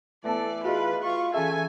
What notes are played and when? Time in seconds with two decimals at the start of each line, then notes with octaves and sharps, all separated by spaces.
0.24 E3 A3 B3 A4 D5 A5
0.64 F4 F#4 G#4 B4 D#5
1.03 F4 C#6
1.34 E3 C#4 G#4 A4 E5 G#5